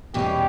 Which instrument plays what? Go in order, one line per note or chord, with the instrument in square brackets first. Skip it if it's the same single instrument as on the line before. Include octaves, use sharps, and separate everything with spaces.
[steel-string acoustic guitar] E2 B2 G3 C#4 [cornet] G4